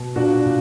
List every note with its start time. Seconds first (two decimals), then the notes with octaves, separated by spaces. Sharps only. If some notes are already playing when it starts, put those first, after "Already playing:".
Already playing: B2
0.16 A#2 D4 F#4
0.45 A#2